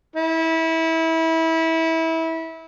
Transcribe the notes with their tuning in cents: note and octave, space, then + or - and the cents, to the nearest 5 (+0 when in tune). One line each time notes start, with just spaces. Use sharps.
E4 -25